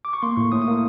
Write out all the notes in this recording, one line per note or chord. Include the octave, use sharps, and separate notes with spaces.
D6
C#6
A#3 C6
A2 C#6
A2 D#6
D#6
A#3